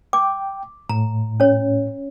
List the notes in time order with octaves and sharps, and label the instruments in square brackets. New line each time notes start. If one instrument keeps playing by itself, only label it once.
[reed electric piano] G5 [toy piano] D6
[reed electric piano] A2 [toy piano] A#5
[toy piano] C#4 C#5